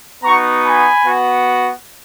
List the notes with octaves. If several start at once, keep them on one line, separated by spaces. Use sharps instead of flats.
B3 D#4 F#4 A#5 C#6
G#5 B5
B3 F#4